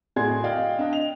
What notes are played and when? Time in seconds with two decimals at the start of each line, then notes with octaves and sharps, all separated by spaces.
0.16 A2 F#4 G#4 D5 C6 G#6
0.44 D5 D#5 F5 G5
0.79 D4 D#5 G5
0.93 F7